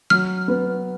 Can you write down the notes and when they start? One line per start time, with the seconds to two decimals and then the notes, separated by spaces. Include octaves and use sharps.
0.10 F#3 F6
0.48 B3